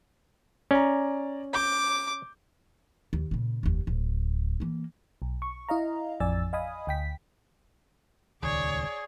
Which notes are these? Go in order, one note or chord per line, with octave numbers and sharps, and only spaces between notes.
C#4 D5 G#5 A#5
D6 G6
D#2
A#2 C#3
F1 D#2
D1
E3 A#3
B1
C#6
E4 D#5 F5 A#5
A1 F2 D5 G#5 E6 A6
D#5 F5 G#5 B5 D#6
D2 G5 B6
D#1 C#2 D#3 G#4 C#5 D5